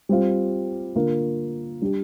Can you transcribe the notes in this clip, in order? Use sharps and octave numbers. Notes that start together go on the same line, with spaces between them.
G3 C4 F4
D3 A#3 F4 A#4
G3 D4 G4